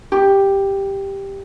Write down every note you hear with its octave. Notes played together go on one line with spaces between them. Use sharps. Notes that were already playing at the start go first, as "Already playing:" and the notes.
G4